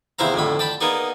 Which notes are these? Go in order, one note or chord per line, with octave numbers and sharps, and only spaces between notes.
E2 C3 E4 C5 F5 A#5
F2 A2 D3 B5
D5 G5 A5 B5
A#3 B3 D#4 G#4 D5